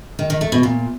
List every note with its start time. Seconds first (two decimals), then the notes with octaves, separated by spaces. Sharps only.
0.19 D#3
0.30 D#3
0.41 A3
0.52 B2
0.63 A#2